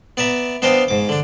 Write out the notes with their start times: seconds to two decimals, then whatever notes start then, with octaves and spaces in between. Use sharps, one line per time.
0.17 B3 D5 E5 A#5
0.62 B3 D4 C5 D#5 F5 G5
0.88 G#2 D6
1.09 D3 D4